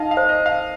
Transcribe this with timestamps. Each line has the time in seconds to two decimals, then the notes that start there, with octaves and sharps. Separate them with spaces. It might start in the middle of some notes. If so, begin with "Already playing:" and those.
Already playing: D#4 D#5 F5
0.11 F5
0.17 C5
0.29 D#5
0.41 D#4 F5